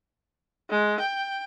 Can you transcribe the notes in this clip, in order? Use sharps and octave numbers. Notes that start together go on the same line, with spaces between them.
G#3
G5